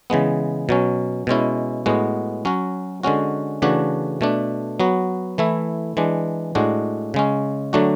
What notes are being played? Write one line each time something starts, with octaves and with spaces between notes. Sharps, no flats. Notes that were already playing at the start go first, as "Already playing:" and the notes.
C#3 E3 G#3 B3
B2 F#3 C#4
B2 G#3 C#4 E4
A2 G#3 B3 F#4
F#3 C#4 F#4
D3 G#3 C#4 F#4
C#3 E3 A3 D4 F#4
B2 A3 D4
F#3 B3 F#4
E3 A3 E4
E3 G#3 D4
A2 G#3 D4 F#4
C#3 G#3 C#4
D3 F#3 A3 D4 F#4